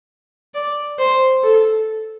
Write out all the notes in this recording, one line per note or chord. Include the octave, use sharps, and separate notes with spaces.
D5
C5
A4